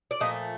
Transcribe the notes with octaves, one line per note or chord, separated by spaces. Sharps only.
D5
A#2 F3 A3 D#5